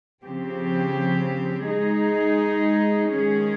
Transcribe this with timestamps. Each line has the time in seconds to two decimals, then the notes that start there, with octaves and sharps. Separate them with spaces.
0.23 C#3 F3 C4 G4
1.67 G#3 D#4 G#4
3.11 D#3 G#3 C#4 G#4